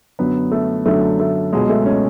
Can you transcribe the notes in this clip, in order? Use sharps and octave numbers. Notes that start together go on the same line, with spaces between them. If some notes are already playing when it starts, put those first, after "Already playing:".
F#2 D3 F#3 B3
A3
F#2 D3 F#3 A3
A3
C#2 B2 F#3 G#3
A3
C#4